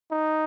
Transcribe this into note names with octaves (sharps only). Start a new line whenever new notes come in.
D#4